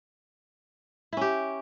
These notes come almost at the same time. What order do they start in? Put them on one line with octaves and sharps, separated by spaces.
E4 C#4 G4